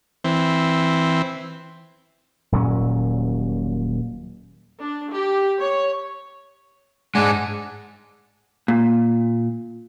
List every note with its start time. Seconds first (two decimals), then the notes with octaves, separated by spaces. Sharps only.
0.24 E3 C4
2.52 D#1 A#2 F#3 C#4
4.79 D4
5.10 G4
5.61 C#5
7.15 G#2 G#3 D4 F#5 G#5
8.68 A#2